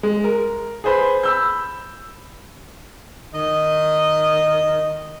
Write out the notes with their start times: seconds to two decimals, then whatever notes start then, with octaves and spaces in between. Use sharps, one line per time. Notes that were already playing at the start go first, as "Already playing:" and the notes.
0.03 G#3
0.24 A#4
0.84 G#4 B4 C5 B5
1.23 B5 E6 G6
3.34 D#3 D#5